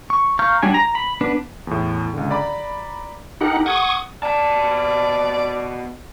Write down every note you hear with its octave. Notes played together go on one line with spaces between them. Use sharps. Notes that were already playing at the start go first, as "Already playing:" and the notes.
C#6
F5 A#5 C#6 F6 G6
F#3 G3 D4 G#5
A#5
B5
B3 D4 B4
E2 A2
C#2 D3
D5 A#5 B5
D#4 G4 A4 A#4 F#5
F#5 C#6 D#6 G#6
B2 D5 A5